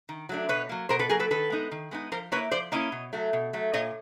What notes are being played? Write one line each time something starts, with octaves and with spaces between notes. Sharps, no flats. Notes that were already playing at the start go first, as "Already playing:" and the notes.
D#3
F#3 A3 D4
B2 B4 C#5
F#3 A#3
B2 A#4 C5
A4 B4
F#3 A#3 G#4 A#4
A4 B4
D#3 A4 B4
G#3 B3 D#4
D#3
G#3 B3 D#4
F3 A#4 C5
A#3 C#4 E4 B4 C#5
F3 C5 D5
A#3 C#4 E4 C#5 D#5
B2
F#3 A3
B2
F#3 A3
A#2 C#5 D#5